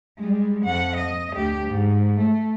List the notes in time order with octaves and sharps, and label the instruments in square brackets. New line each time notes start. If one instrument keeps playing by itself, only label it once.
[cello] G3 G#3
F2 F#5
D#5
D2 G4
G#2
A3